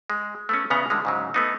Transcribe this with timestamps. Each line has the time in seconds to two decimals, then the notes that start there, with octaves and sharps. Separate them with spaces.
0.10 G#3
0.49 A3 B3 C#4
0.70 E2 C#3 B3 C#4 A#5
0.90 D3 G3 G#3
1.05 G#2 C#3 F#3
1.34 A3 B3 D#4